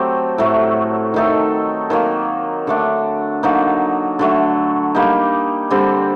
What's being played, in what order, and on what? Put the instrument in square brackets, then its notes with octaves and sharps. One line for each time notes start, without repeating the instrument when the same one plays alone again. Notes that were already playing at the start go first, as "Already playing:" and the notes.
Already playing: [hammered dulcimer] F#3 A3 C4 G4
A2 F#3 A3
D#3 A3 D#4 A4
D#3 F#3 A#3
D3 A3 D4
D3 F#3 A#3 D#4
D3 F#3 A3
G3 A#3 D#4
D3 G3 C4